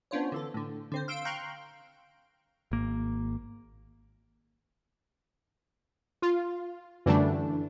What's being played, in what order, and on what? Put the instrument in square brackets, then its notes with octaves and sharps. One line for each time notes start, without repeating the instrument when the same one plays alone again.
[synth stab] B3 C#4 D4 F4 C5 C#5
D3 E3 A4
A2 D3
D3 C4 C5
F5 C6 E6 D7
F5 G5 A#5 C6 C#6 F#6
[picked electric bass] G#1 A#3
[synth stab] F4
[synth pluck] F#2 D3 G3 [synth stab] E3 A3 D4